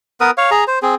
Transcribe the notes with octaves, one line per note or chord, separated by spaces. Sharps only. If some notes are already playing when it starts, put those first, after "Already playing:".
B3 A#4 B4 D#6
C#5 F5
G#4 A#5
C5
C4 G#4